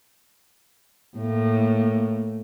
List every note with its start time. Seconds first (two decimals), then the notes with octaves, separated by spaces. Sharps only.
1.16 A2 A#3